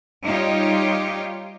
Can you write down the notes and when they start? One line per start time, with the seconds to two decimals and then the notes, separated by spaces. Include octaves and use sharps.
0.24 G3 D#4 F4 G4 C#5